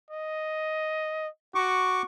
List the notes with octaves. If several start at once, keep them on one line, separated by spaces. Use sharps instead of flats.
D#5
F#4 C#6 D6